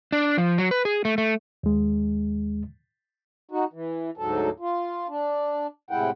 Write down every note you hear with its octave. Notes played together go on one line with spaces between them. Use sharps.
D4
F3
F#3
B4
G#4
A3
A3
D#2 G#3
D#4 F#4
E3
D2 G#2 F#3 A4
F4
D4
A2 C3 G#3 E4 F#5 G5